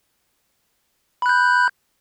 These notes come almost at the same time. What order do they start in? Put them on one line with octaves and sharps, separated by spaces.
B5 F#6 G6